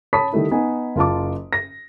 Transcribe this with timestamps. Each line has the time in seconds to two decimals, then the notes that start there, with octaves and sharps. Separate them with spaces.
0.13 C#5 A5 B5 D#6 B6
0.32 D#3 G3 A3 E4
0.51 B3 D#4 G#5
0.96 F#1 F4 A5 D6
1.53 A#6